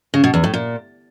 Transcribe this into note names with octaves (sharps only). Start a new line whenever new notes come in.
C#3
B2
E2
A2
A#2